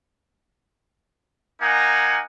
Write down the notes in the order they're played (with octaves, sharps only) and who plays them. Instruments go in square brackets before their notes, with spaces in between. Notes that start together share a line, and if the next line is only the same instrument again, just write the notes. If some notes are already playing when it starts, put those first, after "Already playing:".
[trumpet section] A#3 D#4 F#5 G#5